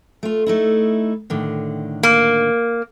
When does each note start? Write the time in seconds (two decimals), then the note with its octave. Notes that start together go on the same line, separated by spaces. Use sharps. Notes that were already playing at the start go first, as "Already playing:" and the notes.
0.23 A3 F4
0.46 A3 D#4 E4
1.30 A2 D3 D#3
2.03 A#3